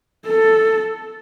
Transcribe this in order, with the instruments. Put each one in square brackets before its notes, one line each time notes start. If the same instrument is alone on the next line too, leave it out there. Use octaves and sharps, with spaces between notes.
[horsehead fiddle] A4